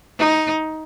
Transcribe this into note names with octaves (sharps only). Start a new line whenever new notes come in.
D#4